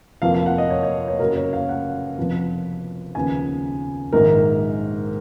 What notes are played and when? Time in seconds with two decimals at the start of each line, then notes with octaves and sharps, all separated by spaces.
0.22 F1 F2 F3 A#3 F5
0.34 F5
0.46 F#5
0.58 D#5
0.70 C#5
0.83 C#5
1.08 C#5
1.19 F#2 C#3 F#3 A#3 A#4
1.36 C#5
1.53 F5
1.69 F#5
2.18 F1 F2 F3 B3
3.15 D#2 C#3 F3 B3 G#5
4.13 A#1 G#2 D#3 A#3 A#4